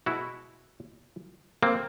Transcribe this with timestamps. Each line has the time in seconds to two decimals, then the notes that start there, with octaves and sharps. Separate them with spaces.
0.06 B2 G#3 E4 F#4
1.63 A#3 C4